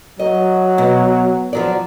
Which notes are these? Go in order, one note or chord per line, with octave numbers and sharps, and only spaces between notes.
F#3 D#5
B2
F3 F#3 D5